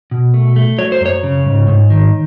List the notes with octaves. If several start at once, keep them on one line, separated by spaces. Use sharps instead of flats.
B2
A3
A3
F#3 C#5
C5
F#2 C#5
C#3
G#2
G#2
D#3